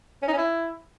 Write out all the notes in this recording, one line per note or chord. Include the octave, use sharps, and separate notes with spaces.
C#4
D#4
C#4
E4